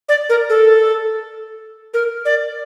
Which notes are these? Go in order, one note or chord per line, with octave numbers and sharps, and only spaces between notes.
D5
A#4
A4
A#4
D5